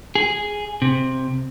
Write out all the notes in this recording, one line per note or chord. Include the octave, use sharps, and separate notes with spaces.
G#4
C3